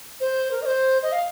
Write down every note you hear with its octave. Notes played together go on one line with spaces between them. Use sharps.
C5
A#4
D#5
C5
D#5
F5